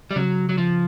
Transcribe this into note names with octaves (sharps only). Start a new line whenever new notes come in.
G3
C#3 F#3
F#3
F3